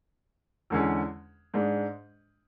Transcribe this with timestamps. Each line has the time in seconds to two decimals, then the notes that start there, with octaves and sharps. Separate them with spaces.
0.70 E2 D3 G#3 C#4 G#4
1.54 G#2 G#3 D4